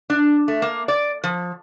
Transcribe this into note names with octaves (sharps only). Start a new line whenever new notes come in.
D4
A3
A#3
D5
F3